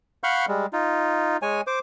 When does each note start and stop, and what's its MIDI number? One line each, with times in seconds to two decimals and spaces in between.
0.24 0.45 77
0.24 0.45 78
0.24 0.45 83
0.24 0.45 85
0.24 0.45 89
0.24 0.45 91
0.48 0.66 55
0.48 0.66 56
0.73 1.37 63
0.73 1.37 65
1.42 1.61 56
1.42 1.61 73
1.42 1.61 80
1.67 1.79 72
1.67 1.79 86